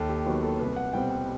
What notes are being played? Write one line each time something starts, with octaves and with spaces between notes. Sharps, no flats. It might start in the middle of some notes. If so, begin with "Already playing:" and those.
Already playing: D#2 A4
G4
D#3 F#3 B3 F#4
A4
C2 B4
F#5
B2 G3 C4 G5
G5